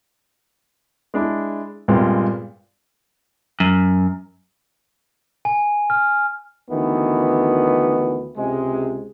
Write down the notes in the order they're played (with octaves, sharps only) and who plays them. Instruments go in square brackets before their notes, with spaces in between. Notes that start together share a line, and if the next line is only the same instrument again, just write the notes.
[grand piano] G#3 D4 E4
G2 A#2 G#3 B3 C4 F4
[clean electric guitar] F#2
[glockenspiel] G#5
F6
[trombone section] D2 D#3 E3 B3
C#2 C3 G#3